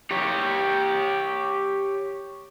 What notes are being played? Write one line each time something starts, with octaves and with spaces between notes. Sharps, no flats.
G4 C#5